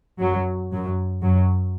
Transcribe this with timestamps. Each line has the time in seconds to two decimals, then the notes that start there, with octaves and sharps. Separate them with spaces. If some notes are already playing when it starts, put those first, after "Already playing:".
0.20 F#2 F#3
0.71 F#2 F#3
1.22 F#2 F#3